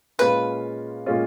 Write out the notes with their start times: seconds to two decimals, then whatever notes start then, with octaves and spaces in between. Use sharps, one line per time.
0.19 A#2 G#3 C#4 F4 B4
1.06 A#2 G#3 C#4 F4